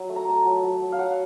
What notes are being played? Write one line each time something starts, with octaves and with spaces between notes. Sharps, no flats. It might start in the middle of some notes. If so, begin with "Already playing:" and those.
Already playing: F#3
A3
A#5
A3 A5
F#3
F#3
F#3
F5
F#3 F#5